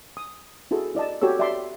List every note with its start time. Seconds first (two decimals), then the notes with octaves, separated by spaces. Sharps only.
0.17 D#6
0.71 E4 F#4 G#4 A4
0.95 E4 D5 D#5 A5
1.22 F#4 G4 A4 C#5 E6
1.39 D5 E5 G5 A5 C6 D6